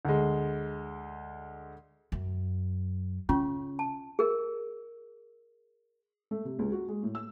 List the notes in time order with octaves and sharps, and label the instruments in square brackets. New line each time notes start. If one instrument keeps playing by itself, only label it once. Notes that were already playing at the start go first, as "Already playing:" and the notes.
[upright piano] D2 G#3
[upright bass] F#2
[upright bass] C#3 [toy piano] C#4 F4 C#6
[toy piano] A5
G#4 A#4
[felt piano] A3
C3
C#2
F#4
G#3
A2
E6